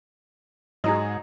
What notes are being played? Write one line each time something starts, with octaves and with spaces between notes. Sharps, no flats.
G#2 F#3 D#4 G#4 D#5 A#5 C6